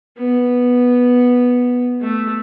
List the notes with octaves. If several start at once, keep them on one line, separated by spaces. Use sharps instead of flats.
B3
A3